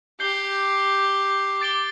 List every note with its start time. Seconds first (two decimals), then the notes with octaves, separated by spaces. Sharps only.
0.20 G4 G6 C7 G7
1.61 D6 A6 D7 G7